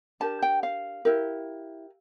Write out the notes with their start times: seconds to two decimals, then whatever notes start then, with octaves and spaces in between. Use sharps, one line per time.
0.20 D4 G4 A#4 A5
0.42 G5
0.63 F5
1.05 E4 G4 A#4